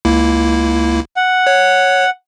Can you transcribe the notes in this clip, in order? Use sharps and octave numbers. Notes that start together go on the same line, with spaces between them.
C#2 A#3 E4
F#5
C#5